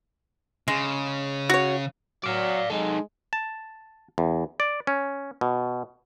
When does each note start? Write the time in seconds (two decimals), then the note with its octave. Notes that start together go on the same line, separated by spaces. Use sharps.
0.68 C#3 G#3
1.49 F#4 C#5
2.24 F#3 D5 F5
2.70 G#3 D#4 A4
3.33 A5
4.18 E2
4.60 D5
4.87 C#4
5.41 B2